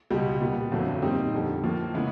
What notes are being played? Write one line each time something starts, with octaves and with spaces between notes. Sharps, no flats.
C#2 B2 G3 B3
A#2 G3 B3
G1 F2 D3 F#3 A3
A#2 G3 C4 D#4
F2 D3 G3
A2 F3 A#3
C#3 E3 G#3 B3